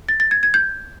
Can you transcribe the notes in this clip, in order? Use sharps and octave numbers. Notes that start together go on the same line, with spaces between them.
A6
A6
G#6
G#6
G6